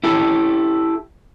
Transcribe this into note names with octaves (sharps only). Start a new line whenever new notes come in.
E4 G4 A4